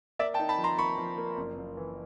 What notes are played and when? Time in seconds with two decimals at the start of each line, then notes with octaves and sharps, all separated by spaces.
0.19 A#3 D5 E5
0.34 G5 A5
0.39 D#4
0.49 A5 B5
0.58 F3
0.64 A#5 C6
0.78 A#3 B5 C#6
0.98 F3
1.18 A#3
1.37 F#1
1.57 F#1
1.77 E3